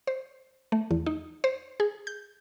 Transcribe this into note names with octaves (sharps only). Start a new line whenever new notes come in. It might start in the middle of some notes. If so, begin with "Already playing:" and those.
C5
A3
E2
D#4
C5
G#4
G6